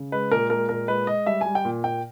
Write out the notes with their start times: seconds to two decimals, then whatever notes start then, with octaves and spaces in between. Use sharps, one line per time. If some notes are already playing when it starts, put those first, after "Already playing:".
Already playing: C#3
0.12 G#3 B4
0.31 A#2 A#4
0.50 G#3 A#4
0.69 A#2 A#4
0.88 G#3 B4
1.07 G#3 D#5
1.26 G3 E5
1.41 G3 G#5
1.55 G5
1.65 A#2
1.84 A#2 G5